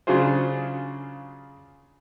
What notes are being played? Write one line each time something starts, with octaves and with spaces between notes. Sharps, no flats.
C#3 F#3 D4 F4 G#4 C5